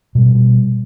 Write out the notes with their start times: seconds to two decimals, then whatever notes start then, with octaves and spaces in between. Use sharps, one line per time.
0.15 B2 G3